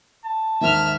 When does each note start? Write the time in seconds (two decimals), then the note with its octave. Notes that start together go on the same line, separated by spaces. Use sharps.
0.24 A5
0.61 D#2 G#2 D#3 E5 F6